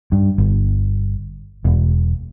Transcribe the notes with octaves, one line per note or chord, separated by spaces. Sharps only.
G2
G1
E1